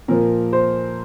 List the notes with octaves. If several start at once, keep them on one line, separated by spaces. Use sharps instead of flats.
A#2 F3 A#4
C5